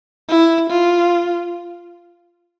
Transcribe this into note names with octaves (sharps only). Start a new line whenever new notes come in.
E4
F4